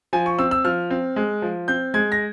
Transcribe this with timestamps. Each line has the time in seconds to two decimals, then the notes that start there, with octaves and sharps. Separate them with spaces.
0.13 F3 G#5
0.26 C#6
0.38 C4 E6
0.51 E6
0.65 F3 F6
0.90 C4
1.16 G#3
1.42 F3
1.68 C4 G6
1.94 G#3 G#6
2.12 A#6